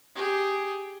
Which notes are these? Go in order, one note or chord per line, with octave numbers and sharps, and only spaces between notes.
G4 G#4